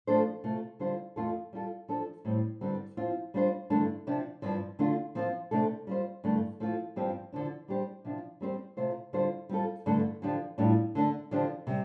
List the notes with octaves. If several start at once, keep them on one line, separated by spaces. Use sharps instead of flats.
F3 A3 D4 A4 C5
C3 A3 F4
D3 G3 F4 C5
F2 F3 A3 F4 A4
G3 F4 A4
F3 D4 A4
A2 G3 C4
G2 D3 G3 C4
F3 C4 F4
G3 D4 F4 C5
G2 D3 A3 D4
C3 F3 D4
G2 F3 C4
D3 A3 D4 F4
F3 C4 F4 C5
C3 A3 D4 A4
G3 F4 C5
G2 D3 A3
F3 A3 F4
G2 F3 C4 G4
D3 F3 D4
G3 D4 G4 C5
C3 F3 D4
G3 C4 G4 C5
C3 A3 F4 C5
D3 G3 F4 C5
G3 C4 F4 A4
G2 D3 A3 D4 A4
D3 F3 D4 G4
A2 G3 D4 F4
D3 A3 D4
D3 F3 D4 G4 C5
C3 G3